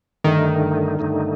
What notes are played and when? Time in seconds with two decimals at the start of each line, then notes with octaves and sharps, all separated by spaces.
0.24 G2 D3 D#3 A3 D#4
0.99 G2 D3 A3 D#4